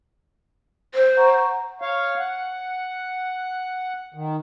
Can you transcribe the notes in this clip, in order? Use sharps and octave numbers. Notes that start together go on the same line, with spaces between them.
C5
F#5 A#5 C#6
C#5 F5
F#5
D#3